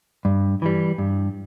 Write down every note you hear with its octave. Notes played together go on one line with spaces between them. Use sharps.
G2
E3 G3
G2